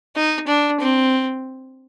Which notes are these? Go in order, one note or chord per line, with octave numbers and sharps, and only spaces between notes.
D#4
D4
C4